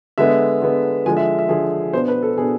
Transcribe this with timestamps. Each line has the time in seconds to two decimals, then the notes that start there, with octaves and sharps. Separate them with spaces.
0.18 D3 G#3 B3 E5
0.62 D3 G#3 B3
1.06 D3 F3 G#3 G#5
1.17 E5
1.39 E5
1.49 D3 F3 G#3 G#4
1.93 B2 B3 D4 C5
2.08 B4
2.23 A4
2.38 B2 B3 D4 G#4